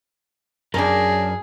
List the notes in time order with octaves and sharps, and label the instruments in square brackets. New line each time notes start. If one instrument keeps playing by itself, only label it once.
[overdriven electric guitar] F#2 [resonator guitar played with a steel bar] D4 A#4 [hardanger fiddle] G#4